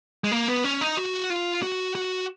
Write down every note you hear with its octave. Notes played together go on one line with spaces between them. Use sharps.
G#3
A#3
B3
C#4
D#4
F#4
F4
F#4
F#4